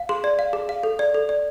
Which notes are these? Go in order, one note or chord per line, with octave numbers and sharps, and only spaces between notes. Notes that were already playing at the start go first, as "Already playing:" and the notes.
Already playing: F5
G#4 C6
D5
F5
G#4
F5
A4
D5
A4
D5